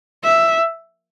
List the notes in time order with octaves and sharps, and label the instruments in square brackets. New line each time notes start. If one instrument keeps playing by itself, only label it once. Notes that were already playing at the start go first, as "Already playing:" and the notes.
[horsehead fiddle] E5